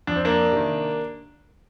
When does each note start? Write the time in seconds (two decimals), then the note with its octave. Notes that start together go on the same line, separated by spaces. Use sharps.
0.07 F2 D4
0.16 C4
0.25 A#3 D4
0.52 C3 D#3